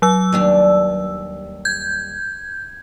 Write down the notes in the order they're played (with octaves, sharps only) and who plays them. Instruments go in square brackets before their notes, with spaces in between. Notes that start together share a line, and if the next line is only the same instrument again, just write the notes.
[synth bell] F#3 E6
[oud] D#2 G3 D4
[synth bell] G6 G#6